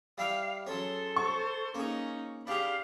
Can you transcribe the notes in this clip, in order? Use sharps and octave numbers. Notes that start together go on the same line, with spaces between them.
G3 E4 F5 G5
F#3 C#4 G#4 A4 C6
C5 C#6
A#3 C#4 D#4 G#4
D4 G4 G#4 F5 B5